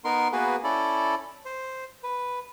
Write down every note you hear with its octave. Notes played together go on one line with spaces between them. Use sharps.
B3 D#4 A#4 C6
A#3 B3 F#4 G#4 B4
C#4 E4 A4 D5
C5
B4